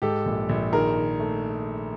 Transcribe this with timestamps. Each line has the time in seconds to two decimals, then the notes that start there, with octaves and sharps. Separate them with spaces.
0.02 G#2 G4 A4
0.26 A#1
0.49 A#1
0.72 D#3 G#4 A#4
0.96 D#3
1.20 A3